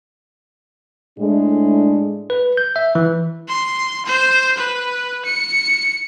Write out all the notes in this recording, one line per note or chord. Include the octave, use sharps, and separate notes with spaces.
A2 G#3 D4
B4
G6
E5
E3
C6
C5
B4
C#7